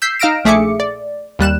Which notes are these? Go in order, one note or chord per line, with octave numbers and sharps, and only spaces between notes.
E6 G6 B6 C7
D#4 F5 F6 A#6 D7 E7
A#1 A3 G#4 E5 D6 C#7
D5
D#2 G3 F#6 E7